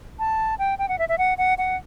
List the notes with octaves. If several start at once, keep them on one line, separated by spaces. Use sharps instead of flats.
A5
G5
G5
F#5
E5
E5
F#5
F#5
F#5